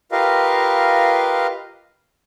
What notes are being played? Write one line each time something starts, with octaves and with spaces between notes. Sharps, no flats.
F4 G4 A#4 B4 D#5 F5